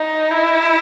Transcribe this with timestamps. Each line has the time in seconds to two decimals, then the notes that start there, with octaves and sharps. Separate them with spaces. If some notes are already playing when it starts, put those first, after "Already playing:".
Already playing: D#4
0.31 E4